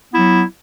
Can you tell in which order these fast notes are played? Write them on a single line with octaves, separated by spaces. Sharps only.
B3 E4 F#3